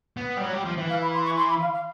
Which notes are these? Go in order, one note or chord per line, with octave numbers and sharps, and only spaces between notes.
B3
G3
F#3
G3
F3
E3
F5
B5
C6
C#6
C6
B5
F5
F5